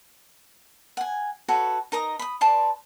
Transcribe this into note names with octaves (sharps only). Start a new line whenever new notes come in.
F#5 G#5
F#4 A4 B4 C#5
D#4 A#4 A#5 D#6
B5 D#6
B4 D5 A5 C6